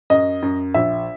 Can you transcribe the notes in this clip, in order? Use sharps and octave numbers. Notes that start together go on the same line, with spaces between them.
F#2 D#5
F#2
A#1 E5